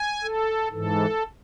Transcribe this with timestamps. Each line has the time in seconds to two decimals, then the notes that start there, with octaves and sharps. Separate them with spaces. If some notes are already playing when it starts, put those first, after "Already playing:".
Already playing: G#5
0.23 A4
0.71 G#2 E3 A4